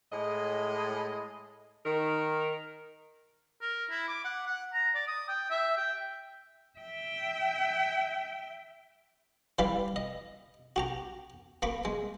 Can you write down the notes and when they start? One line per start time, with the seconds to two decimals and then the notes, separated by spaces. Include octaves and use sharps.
0.12 A2 G#3 D#5
1.86 D#3 A#4
3.61 A#4
3.90 E4
4.08 D6
4.25 F#5
4.47 F#5
4.73 A#5
4.95 D5
5.08 D#6
5.28 G5
5.50 E5
5.77 G5
6.79 E5 G5
9.59 E3 G3 D5 F5 B5
9.96 D#5
10.76 F#4 G4 A#5
11.62 A#3 B5 C#6 D6
11.85 G#3